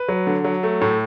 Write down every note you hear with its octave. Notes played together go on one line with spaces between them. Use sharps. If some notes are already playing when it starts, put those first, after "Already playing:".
Already playing: B4
F#3
D3
F#3
A3
A2